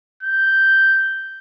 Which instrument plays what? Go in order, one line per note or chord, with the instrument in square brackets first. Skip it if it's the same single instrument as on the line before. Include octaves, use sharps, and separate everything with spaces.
[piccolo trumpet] G6